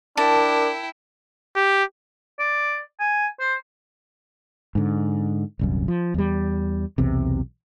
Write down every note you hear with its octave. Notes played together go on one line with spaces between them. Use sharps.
D4 E4 A#4 G5 A5
G4
D5
G#5
C5
G#2 D3
D#1 C2 F#2
F3
E2 G3
B1 E2 C3